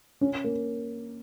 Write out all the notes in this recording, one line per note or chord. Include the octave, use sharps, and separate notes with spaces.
C#4
A#3